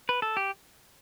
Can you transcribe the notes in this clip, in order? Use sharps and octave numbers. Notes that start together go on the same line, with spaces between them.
B4
A4
G4